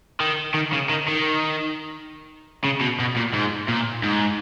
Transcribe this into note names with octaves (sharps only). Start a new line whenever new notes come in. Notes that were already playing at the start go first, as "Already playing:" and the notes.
D#3
D#3
C#3
D#3
D#3
C#3
B2
B2
A#2
G#2
A#2
G#2